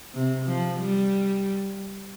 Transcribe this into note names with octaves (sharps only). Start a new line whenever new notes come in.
C3
F3
G3